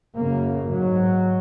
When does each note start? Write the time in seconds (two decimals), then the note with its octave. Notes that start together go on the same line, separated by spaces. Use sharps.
0.16 F#2 C#3 A#3
0.71 G#2 F#3